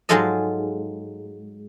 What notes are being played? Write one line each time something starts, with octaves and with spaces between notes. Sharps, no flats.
G#2 F#3 G#3 F4 A4 D#5